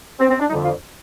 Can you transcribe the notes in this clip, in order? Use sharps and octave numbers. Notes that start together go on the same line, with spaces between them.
C4
C4
D4
F2 D3 G3 D#4
F4